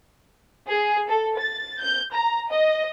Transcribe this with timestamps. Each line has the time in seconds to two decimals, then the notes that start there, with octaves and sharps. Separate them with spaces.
0.68 G#4
1.08 A4
1.38 A6
1.80 G6
2.13 A#5
2.51 D#5